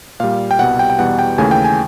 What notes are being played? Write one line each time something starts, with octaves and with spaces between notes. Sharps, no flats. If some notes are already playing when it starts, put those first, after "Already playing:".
A#2 G3 F5
G5
C2 B2 G3 F#5
G5
G5
E2 B2 G3 F#5
G5
D#2 C#3 E3 A3 G#5
G5
G#5